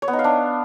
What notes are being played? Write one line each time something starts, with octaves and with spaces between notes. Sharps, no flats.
C#5
B3
D#4
F5
D4